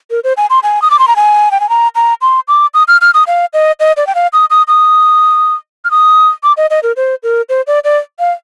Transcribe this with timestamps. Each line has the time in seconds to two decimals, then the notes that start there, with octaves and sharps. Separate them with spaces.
0.11 A#4
0.24 C5
0.37 G#5
0.50 C6
0.63 G#5
0.82 D#6
0.90 D6
0.99 C6
1.08 A#5
1.16 G#5
1.51 G5
1.60 G#5
1.69 A#5
1.95 A#5
2.22 C6
2.48 D6
2.74 D#6
2.88 F6
3.01 F6
3.14 D#6
3.27 F5
3.54 D#5
3.80 D#5
3.97 D5
4.07 G5
4.15 F5
4.33 D#6
4.50 D#6
4.68 D#6
5.85 F6
5.91 D#6
6.43 D6
6.57 D#5
6.70 D#5
6.83 A#4
6.96 C5
7.23 A#4
7.49 C5
7.67 D5
7.84 D5
8.19 F5